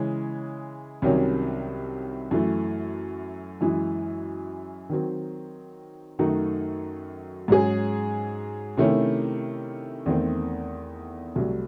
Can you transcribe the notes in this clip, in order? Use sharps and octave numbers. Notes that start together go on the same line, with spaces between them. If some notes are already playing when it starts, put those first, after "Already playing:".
Already playing: C#3 E3 G#3 C#4
C2 C3 D#3 F#3 C#4
F#2 E3 A3
F#2 E3 G#3
D#3 F#3 C4
F#2 D#3 A3 D#4 F#4
G#2 F#3 C#4 G#4
C3 D#3 A3 C#4 E4
E2 D#3 A3 C4
C2 C3 F#3 A3